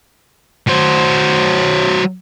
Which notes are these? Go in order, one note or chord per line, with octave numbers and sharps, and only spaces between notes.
F#3 C5